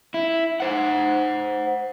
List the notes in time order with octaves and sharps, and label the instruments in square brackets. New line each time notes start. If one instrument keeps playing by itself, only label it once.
[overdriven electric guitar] E4
C5 F#5